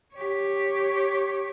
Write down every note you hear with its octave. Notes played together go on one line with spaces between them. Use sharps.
G4 C#5